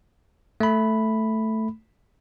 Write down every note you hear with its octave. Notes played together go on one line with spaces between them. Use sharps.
A3 B5